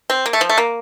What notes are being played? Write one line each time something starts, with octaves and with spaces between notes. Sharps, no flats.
C4
A#3
A3
F3
A3
A#3